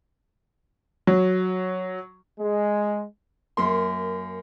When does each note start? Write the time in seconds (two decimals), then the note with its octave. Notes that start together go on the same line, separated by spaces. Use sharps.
1.07 F#3
2.40 G#3
3.57 F#2 A#3 C6